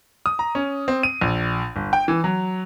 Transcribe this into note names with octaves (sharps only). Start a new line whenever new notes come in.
D#6
A#5
C#4
C4
D#7
A#1
G1
G5
E3
F#3